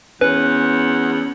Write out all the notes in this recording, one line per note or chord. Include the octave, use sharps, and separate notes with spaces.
E2 C#4 B4 F#5